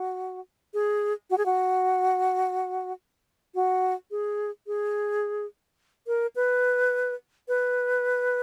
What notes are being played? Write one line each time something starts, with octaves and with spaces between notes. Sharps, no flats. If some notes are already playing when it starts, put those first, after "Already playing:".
Already playing: F#4
G#4
F#4
G#4
F#4
F#4
G#4
G#4
A#4
B4
B4